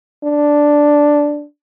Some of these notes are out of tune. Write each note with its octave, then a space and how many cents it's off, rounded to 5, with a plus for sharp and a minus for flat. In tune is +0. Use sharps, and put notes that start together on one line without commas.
D4 +0